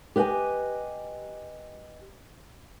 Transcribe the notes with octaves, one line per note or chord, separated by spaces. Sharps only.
G4 B4 D#5 F5 G#5